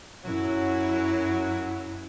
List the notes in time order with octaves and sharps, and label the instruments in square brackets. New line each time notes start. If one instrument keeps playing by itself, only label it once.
[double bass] F#2 [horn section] F#3 [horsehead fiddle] E4